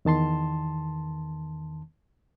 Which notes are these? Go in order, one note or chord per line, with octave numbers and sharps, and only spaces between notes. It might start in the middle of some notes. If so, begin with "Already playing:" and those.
E2 D#3 A5 C6